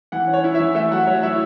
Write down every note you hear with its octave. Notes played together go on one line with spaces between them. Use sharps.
E3 F#5
C#4
C#5
E4
E3 E5
A3 E5
F#3 F#5
F#3 C#5
E4 E5